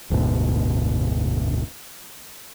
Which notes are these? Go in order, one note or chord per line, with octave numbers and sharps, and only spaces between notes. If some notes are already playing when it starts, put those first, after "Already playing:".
F#1 D2 G#2 B2